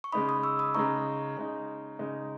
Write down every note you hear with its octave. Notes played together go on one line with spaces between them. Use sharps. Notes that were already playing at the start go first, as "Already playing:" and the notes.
C#6
C#3 G#3 D#4 B5 D#6
B5 D#6
C#6 E6
B5 D#6
C#3 G#3 D#4 A#5 C#6
C#3 G#3 D#4
C#3 G#3 D#4